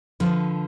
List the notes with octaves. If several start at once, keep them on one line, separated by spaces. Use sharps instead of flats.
D3 F3 B4